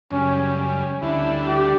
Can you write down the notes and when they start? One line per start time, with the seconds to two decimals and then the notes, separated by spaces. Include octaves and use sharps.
0.11 F#2 C#3 G3 C#4
0.56 C#4
1.02 D2 D3 G3 D4 E4 A4
1.47 G4